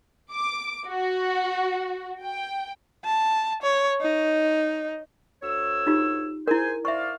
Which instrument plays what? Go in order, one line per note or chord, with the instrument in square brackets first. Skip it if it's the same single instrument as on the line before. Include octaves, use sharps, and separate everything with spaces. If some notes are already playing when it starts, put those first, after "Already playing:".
[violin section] D6
F#4
G5
[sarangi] A5
C#5
D#4
[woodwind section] D2 C#5 E6
[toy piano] D#4 F4 G4
[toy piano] E4 A#4 [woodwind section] G#4 C5 G#5
[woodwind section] C5 D5 F5 [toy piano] E5 C#6